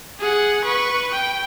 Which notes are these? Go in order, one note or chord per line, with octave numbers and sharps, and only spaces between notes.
G#4 F#5
B4 C#6
G5